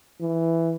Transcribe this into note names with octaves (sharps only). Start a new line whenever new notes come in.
E3